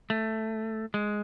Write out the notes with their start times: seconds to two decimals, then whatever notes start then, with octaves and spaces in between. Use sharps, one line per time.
0.10 A3
0.94 G#3